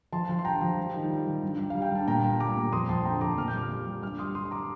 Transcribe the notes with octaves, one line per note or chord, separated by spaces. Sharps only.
F3 A5 C6
F3
C6
G2 G5 A#5
F3
G3
D#3
G3
G3
G2
G3
G3 F5
G5
G2 A5
A#2 G5 A#5
G3
G3 A#5 D6
A#2
F2 C6 D#6
F2 A5 C6
D3 G5 A#5
F2 A#5 D6
A#2 F6
G6
G3 D6 F6
G3
G3
G2 D6 F6
G3 C6 D#6
G2 C6 D#6
C6
A#5 D6